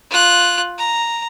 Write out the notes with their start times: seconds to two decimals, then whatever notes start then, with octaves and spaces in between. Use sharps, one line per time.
0.10 F4 F#6
0.78 A#5